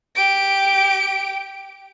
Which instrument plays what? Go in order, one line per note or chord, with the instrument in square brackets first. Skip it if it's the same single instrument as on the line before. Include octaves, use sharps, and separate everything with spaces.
[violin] G4 D7